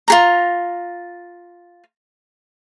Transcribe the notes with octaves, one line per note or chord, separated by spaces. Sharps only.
F4 G#4 A#5